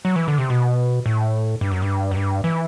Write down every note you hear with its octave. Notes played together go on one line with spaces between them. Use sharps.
F#3
E3
D3
C3
B2
A2
G2
F#2
G2
F#2
G2
E3